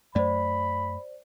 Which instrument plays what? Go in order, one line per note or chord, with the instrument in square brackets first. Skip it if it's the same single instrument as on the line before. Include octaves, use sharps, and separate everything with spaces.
[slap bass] F#2 A3 [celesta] C5 D5 [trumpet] B5